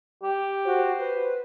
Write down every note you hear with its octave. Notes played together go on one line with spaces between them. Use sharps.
G4
F#4 C5
B4